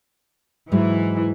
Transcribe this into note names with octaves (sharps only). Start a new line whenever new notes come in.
G#2 E3 F#3 G#3